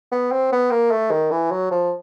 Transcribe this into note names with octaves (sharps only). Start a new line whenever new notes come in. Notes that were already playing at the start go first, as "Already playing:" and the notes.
B3
C4
B3
A#3
A3
D#3
E3
F#3
F3